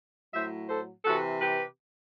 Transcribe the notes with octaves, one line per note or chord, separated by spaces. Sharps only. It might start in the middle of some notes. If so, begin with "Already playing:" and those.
A2 F#3 C5 E5
A4 C5
C3 E3 F#4 A4
G4 B4